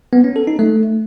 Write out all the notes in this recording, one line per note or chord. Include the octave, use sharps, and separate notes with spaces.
B3
C#4
A4
D#4
A3